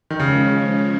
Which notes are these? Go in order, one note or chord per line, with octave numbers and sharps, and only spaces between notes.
D#3
C#3 F3 G#3 C#4